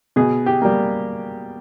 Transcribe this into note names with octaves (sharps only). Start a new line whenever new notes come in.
B2 G#4
G4
G3 A#3